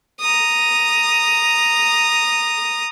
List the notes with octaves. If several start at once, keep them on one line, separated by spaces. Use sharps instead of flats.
A#5 D#6